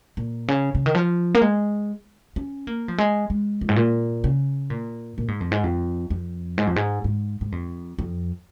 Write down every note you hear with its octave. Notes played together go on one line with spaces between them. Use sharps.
A#2
C#3
C#3
D#3
F3
A#3
G#3
C#4
A#3
F3
G#3
G#3
F2
G#2
A#2
C#3
A#2
A#2
G#2
F2
G#2
F2
F2
G#2
F2
G#2
G#2
G#2
F2
F2